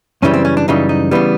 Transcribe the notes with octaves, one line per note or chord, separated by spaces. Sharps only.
F#2 C#3 E3 G3 C#4
C4
C#4
D4
F#2 C#3 E3 G3 D#4
D#4
C#3 E3 G3 B3